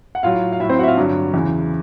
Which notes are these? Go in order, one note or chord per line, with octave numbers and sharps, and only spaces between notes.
F#5
A2 F#3 F4 F5
F5
A2 F#3 E4 E5
C4 C5
F#4 F#5
E5
F4 F5
G2 D3 F#3
E2 C#3 E3